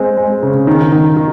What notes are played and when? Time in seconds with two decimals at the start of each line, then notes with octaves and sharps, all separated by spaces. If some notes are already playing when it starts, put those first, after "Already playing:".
Already playing: G#3 C4
0.17 G#3
0.43 C#3
0.67 D#3
0.92 D#3
1.17 D#3